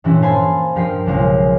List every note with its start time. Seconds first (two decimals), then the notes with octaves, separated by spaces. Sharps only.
0.04 G2 A#2 E3 C#4 E4
0.22 C5 F5 G#5 A5 B5 C6
0.75 G2 F3 A#4 G5 B6 C7
1.06 B1 C#3 G#3 F4 A#4